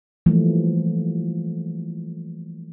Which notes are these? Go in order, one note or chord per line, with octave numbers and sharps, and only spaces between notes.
E3 F3 G3 A3 A#3